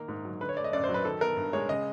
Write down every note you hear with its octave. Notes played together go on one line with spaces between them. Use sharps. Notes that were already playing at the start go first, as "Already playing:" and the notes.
Already playing: D#3 A#3 A#4
G#2
F#3
D3 B4
C#5
A3 D5
D#5
F#2 D5
C5
F#3
B4
D#3 A4
B3 A#4
G2
G#3 C#5
C#3 D#5